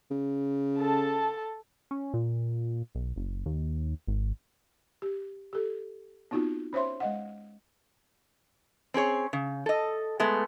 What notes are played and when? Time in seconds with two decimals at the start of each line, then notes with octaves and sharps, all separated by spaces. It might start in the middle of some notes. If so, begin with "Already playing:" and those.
0.11 C#3
0.78 A4 A5
1.91 C#4
2.14 A#2
2.95 B1
3.16 F#1
3.46 D#2
4.07 G#1
5.02 G4
5.53 G4 A4
6.31 B3 C4 D#4 F4 F#4
6.73 C#4 C5 C#5 E5 C6
7.00 G#3 D#5 F#5
8.94 C4 C#4 G#4 C#5
9.33 C#3
9.66 A4 D#5
10.20 G#3 A3 B3